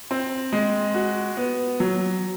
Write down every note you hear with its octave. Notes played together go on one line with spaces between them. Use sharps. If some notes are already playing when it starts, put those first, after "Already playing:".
C4
G#3
F#4
B3
F#3